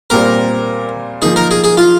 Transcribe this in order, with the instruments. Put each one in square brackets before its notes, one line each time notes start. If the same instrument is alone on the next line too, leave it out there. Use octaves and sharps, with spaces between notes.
[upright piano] A#2 G3 C4 [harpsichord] A#4
[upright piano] F3 A#3 D#4 [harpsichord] G#4
[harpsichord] A#4
G#4
G#4
F4